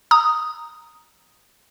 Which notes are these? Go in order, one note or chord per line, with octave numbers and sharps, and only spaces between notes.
A#5 D#6